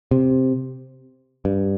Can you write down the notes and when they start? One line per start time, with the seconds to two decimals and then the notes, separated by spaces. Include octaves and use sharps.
0.11 C3
1.45 G2